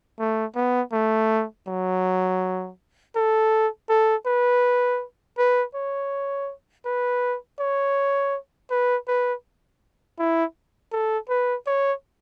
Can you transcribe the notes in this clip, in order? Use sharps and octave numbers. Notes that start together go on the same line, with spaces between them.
A3
B3
A3
F#3
A4
A4
B4
B4
C#5
B4
C#5
B4
B4
E4
A4
B4
C#5